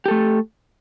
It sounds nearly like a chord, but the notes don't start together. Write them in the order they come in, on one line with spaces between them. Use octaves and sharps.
G4 A4 A3